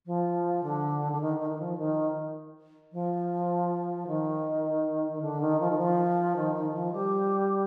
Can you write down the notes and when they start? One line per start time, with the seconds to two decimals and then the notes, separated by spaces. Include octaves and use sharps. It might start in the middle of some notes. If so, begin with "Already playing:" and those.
0.06 F3
0.63 D3
1.12 D3
1.21 D#3
1.40 D#3
1.50 D#3
1.59 F3
1.77 D#3
2.92 F3
4.07 D#3
5.12 D#3
5.21 D3
5.41 D#3
5.60 F3
5.71 D#3
5.78 F3
6.36 D#3
6.55 D#3
6.74 F3
6.92 G3